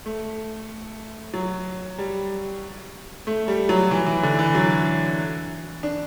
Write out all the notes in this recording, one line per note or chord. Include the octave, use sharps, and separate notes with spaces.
A3
F#3
G3
A3
G3
F#3
E3
E3
D3
E3
F#3
D4